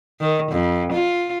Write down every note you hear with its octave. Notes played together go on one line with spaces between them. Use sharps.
D#3
F2
F4